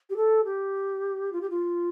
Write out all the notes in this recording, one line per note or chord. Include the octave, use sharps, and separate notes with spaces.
G4
A4
G4
F4
G4
F4